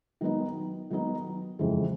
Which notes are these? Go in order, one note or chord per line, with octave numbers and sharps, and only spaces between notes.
D#3 F#3 B3 D#4
D#3 F#3 B3 D#4
F2 C#3 E3 G#3